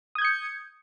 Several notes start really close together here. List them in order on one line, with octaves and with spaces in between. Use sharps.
D#6 G#6 G6 C#7